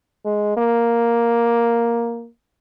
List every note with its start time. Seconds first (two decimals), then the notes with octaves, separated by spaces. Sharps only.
0.25 G#3
0.57 A#3